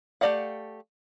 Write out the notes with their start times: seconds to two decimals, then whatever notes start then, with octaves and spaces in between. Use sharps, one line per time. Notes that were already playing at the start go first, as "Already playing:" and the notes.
0.21 A3 G4 D5 F5 F#5